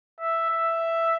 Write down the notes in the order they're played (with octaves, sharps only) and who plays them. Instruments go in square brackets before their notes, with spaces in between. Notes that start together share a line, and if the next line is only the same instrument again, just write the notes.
[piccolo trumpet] E5
E5